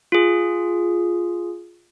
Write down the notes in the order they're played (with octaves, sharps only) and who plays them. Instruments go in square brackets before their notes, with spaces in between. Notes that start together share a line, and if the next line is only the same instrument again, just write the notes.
[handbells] F4 G#4